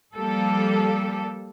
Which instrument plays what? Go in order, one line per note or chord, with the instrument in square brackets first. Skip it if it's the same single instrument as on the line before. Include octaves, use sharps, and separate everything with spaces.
[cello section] F3 G3 A#3 G4 A4